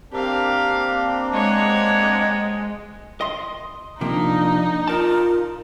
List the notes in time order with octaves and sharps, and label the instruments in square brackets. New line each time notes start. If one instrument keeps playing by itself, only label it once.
[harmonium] A#3 C4 D4 [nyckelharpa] G4 F5
[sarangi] G#3 [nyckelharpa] C#5 F#5
[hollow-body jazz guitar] D#5 C6
[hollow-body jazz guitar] C3 F3 A#3 [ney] D4 [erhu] D#4
[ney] F4 [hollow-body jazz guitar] A#4 D5 A5